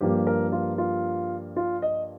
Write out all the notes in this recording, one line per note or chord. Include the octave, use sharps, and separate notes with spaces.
G2 F3 A#3 G4
A#4
F4
F4
F4
D#5